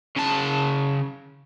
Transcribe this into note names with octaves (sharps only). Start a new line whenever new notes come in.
C#3 A5